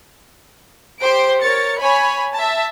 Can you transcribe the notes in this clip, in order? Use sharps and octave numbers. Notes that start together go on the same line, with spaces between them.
G4 C5 C6 D7
A#4 C#5 A6 C#7
C#5 G#5 B5
E5 A5